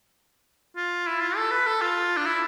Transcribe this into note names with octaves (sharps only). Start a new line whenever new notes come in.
F4
E4
F4
A4
B4
A4
F4
D4
E4